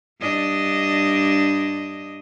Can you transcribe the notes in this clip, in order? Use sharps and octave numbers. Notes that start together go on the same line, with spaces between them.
G2 D4 D#5